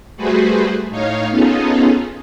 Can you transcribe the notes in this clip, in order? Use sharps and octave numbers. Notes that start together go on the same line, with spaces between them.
G3 A3 F#4 G#4 B4 C5
A2 D#4 C#5 F5
B3 C#4 D#4 F4 G#4 A4